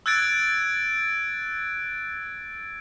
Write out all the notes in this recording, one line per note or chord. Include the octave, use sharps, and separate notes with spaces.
E6 F#6 G#6 A6 D7